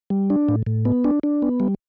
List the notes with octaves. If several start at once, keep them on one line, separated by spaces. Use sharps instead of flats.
G3
D4
A2
A2
B3
D4
D4
B3
G3